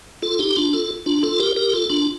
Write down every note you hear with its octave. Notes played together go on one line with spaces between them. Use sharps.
F4 A4
D#4 G4
D4 F4
F4 A4
D4 F4
F4 A4
G4 A#4
G4 A#4
F4 A4
D4 F4